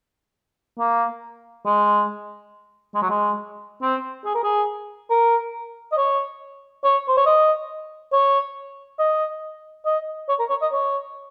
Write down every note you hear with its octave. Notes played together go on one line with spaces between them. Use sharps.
A#3
G#3
G#3
F#3
G#3
C4
G#4
A#4
G#4
A#4
D#5
C#5
C#5
C5
C#5
D#5
C#5
D#5
D#5
C#5
A#4
C#5
D#5
C#5